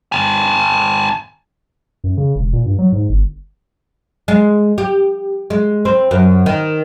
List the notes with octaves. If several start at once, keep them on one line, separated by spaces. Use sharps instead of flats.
G#5 A5
F#2
C#3
E1
A#2
G2
F#3
G#2
G1
G#3
G4
G#3
C4
F#2
D#3